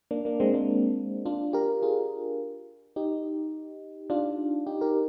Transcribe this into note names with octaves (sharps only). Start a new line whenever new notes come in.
A#3 D4
A#3 D4
G#3 C4
A#3 D4
D4 F4
G4 A#4
F4 G#4
D#4 G4
D4 F4
D#4 G4
G4 A#4